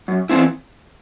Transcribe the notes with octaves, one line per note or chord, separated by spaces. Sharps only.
F#2
E3 G3 C4 E4